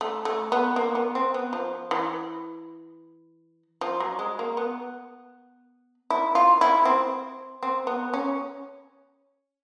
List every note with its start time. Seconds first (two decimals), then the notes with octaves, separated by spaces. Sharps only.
0.01 A3
0.25 A3
0.52 B3
0.76 A#3
0.95 B3
1.15 C4
1.34 B3
1.53 F3
1.91 E3
3.81 F3
4.00 F#3
4.19 G#3
4.39 A#3
4.57 B3
6.10 E4
6.35 F4
6.61 E4
6.85 C4
7.63 C4
7.87 B3
8.14 C#4